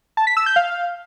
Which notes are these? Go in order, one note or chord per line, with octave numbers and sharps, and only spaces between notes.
A5
B6
E6
G6
F5